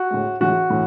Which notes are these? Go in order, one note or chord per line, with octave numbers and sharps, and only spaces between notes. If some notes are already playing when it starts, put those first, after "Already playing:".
Already playing: F#4
A2 G#3
A2 E3 G#3 F#4
A2 E3